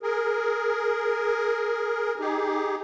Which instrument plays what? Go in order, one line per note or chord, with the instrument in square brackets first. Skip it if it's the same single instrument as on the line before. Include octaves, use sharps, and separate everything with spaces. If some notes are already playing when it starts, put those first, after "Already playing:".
[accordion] G#4 A#4
D#4 G4 G#4